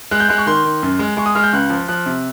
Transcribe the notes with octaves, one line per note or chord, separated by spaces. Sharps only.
G#3 F#6
G6
G#3 F#6
C#6
D#3 C6
D#3
F#2
G#3
G#3 C#6
D#6
G#3 F6
G6
C#2 F#6
F3
F3 F#6
C3